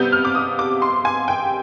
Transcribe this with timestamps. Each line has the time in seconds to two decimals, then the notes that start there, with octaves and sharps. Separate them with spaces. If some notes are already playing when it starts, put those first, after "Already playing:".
Already playing: C3 G3 B3 G6
0.12 F6
0.25 D6
0.35 D#6
0.59 D6
0.82 C6
1.05 G#5
1.28 G5